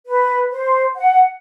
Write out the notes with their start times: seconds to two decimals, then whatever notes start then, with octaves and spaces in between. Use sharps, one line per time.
0.07 B4
0.51 C5
0.96 F#5